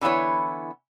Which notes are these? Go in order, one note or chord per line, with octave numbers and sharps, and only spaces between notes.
D3 E3 B3 E4 C#5